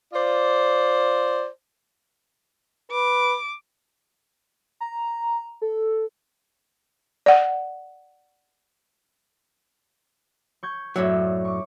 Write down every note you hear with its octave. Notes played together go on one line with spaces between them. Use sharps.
F4 C5 D5
B4 D6
A#5
A4
D5 F#5
C#6 G6 G#6
F#2 A2 F#3 C#5 D5 E5
C#6 D6